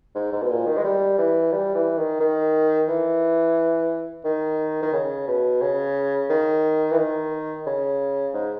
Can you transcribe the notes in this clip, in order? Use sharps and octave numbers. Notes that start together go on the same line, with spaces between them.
G#2
G#2
B2
A#2
D#3
G#3
G3
E3
G3
E3
D#3
D#3
E3
D#3
D#3
C#3
B2
C#3
D#3
E3
D#3
C#3
G#2